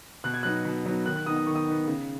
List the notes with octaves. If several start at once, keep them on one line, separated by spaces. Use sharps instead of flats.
B2 F#6
G#6
F#3 B3 D#4 F#6
B2
F#3 B3 D#4
D#3 F#6
F#6
B3 D#4 D#6
D#6
D#3 C#6
D#6
B3 D#4
C#3